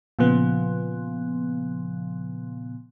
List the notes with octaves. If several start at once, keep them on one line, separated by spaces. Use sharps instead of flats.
A#2 C#3 F3 B3